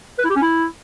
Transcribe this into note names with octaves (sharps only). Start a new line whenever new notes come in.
B4
E4
G4
C#4
E4